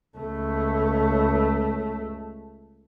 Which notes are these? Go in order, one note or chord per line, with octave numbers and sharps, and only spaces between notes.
C#2 A3